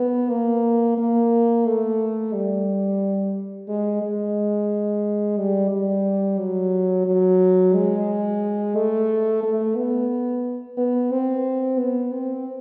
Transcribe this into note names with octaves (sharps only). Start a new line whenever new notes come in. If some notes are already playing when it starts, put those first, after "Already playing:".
Already playing: B3
A#3
A#3
A3
G3
G#3
G#3
G3
G3
F#3
F#3
G#3
A3
A3
B3
B3
C4
B3
C4